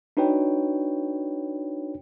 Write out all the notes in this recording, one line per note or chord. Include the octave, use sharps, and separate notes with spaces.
D4 D#4 F#4 B4 C#5 G5